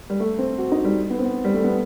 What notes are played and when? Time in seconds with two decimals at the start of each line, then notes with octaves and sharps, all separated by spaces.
0.10 G3
0.20 A3
0.38 C4
0.58 F#4
0.72 D#4
0.84 G3
1.10 B3
1.18 C4
1.22 B3
1.44 G3
1.54 A3
1.64 B3